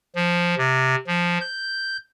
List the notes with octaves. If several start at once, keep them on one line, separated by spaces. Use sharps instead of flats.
F3
C3
F3
G6